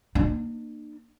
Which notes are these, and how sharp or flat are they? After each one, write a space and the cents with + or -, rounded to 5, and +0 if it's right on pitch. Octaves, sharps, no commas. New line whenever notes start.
A#3 +0 D4 +45